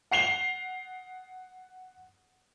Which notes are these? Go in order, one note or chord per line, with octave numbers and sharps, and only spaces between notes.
F#5 C7 F7 G7